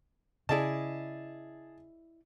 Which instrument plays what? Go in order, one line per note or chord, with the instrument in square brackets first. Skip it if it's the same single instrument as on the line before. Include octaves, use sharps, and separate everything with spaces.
[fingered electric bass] C#3 [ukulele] E4 D5 D#5 [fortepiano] G#4 A5